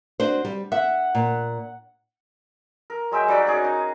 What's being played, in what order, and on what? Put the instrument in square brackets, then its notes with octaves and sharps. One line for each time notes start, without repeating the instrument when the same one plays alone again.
[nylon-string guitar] D4 F#4 C5
G3
[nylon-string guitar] E5 [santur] F#5
[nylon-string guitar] A#2
[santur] A#4
F#3 G#3 E5 G5
G3 D#4 F#4 D5
C#4 G#4
D#4